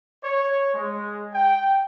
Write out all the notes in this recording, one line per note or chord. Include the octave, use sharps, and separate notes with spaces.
C#5
G#3
G5